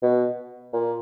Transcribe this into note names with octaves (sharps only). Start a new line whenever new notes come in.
B2
A#2